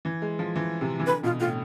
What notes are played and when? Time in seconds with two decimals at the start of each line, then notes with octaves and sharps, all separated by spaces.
0.05 E3
0.22 G#3
0.39 F3
0.56 E3
0.81 C3
0.99 E3
1.07 D3 B4
1.23 B2 F4
1.40 A2 F4